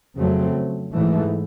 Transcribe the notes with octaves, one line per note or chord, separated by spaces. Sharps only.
F2 C#3 F#3 A3 C4
G#2 E3 A3